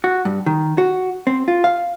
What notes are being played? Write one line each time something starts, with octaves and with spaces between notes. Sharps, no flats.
F#4
G2
D#3
F#4
C4
F4
F5